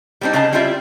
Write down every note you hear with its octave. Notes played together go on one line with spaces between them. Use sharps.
G3 B3 C4 D4 D#4
C#3 G#4 D5 D#5 A5
G3 C4 E4 F4 D5 E5